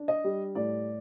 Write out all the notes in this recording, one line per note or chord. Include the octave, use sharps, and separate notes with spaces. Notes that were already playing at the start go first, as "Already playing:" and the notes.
Already playing: D4
D#5
G3
A2 D5